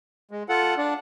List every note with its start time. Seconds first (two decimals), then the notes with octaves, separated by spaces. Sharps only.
0.31 G#3
0.49 F4 A4 F#5
0.78 D4